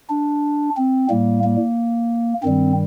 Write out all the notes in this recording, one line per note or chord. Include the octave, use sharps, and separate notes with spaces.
D4
C4
A2 G3 A#3
A#3
G2 D#3 G3 C4